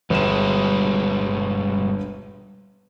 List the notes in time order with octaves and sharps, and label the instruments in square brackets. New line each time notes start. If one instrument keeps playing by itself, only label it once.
[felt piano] G1 E7 [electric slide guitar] G2 B2 G#3